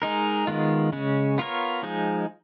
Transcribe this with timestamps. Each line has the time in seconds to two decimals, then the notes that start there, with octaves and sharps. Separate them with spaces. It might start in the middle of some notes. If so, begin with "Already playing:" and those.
0.02 G#3 D#4 A#4
0.47 D#3 G#3 B3 F4
0.93 C#3 G#3 C#4
1.38 B3 F4 A#4 C#5
1.83 F3 G#3 D#4 G#4